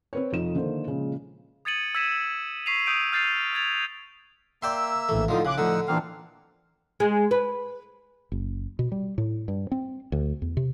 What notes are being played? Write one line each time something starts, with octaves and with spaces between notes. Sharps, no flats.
C4 B4 C#5
F1 F2 F3 D#4 E7
D3 D#3 A#3 C5
A#2 C#3 F3 G#3
D#6 G#6 A6 C#7 D#7 F#7
E6 G#6 B6 D#7 E7
C#6 B6 C7 D#7 F7
D#6 E6 G6 D7 D#7 F7
F6 G6 A6 C7 D#7 F7
E6 G#6 A6 F7
A#3 D5 E5 G5 C6 E6
A#1 A2 E3 A3
A2 D3 F3 D#4 F4
C#3 D6 F#6
A2 D3 F3 D#4 F#5 E6
A#2 E3 A#3 C4 D4 F5
G#3
B4
F#1
B2
G3
A2
G2
C4
D2
E2
C3